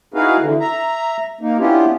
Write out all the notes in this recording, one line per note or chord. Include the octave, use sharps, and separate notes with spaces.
D#4 E4 F#4 G#4 B4 F5
D3 E3
E5 A#5
A#3 D#4
B3 C#4 D4 E4 F4 G4